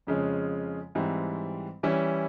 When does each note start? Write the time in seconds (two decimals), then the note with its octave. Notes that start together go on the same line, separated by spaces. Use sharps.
0.07 F2 C#3 F3 G#3 C#4
0.95 G#2 E3 G3 C4
1.83 E3 G3 C#4 E4